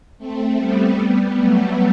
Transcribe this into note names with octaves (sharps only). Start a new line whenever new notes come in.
A3 C4
G3 B3
F#3 A3